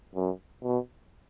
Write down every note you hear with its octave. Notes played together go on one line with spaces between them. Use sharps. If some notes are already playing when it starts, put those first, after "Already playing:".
F#2
B2